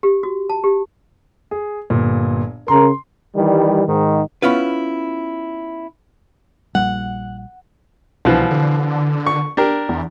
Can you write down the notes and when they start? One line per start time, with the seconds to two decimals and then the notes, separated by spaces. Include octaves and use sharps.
0.03 G4
0.23 F#4
0.50 A5
0.64 G4
1.51 G#4
1.90 G1 A#2
2.68 C#3 A#4 C6
3.35 D#3 E3 G3
3.87 G#2 D#3
4.42 B3 C#4 E4 F4 B4
6.75 A#1 G3 F#5
8.25 C2 B2 E3 F3
8.51 D3
9.26 C#6
9.57 D4 G4 A#4
9.89 E2